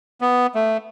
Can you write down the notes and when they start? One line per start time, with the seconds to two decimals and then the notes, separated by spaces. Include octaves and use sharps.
0.21 B3
0.55 A3